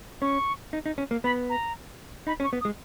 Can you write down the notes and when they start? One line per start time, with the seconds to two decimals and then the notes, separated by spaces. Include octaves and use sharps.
0.22 C#4 C#6
0.73 D#4
0.86 D#4
0.98 C#4
1.11 A#3
1.24 B3 B5
1.49 A#5
2.27 D#4 B5
2.40 C#4
2.44 C#6
2.53 B3
2.61 D#6
2.65 G#3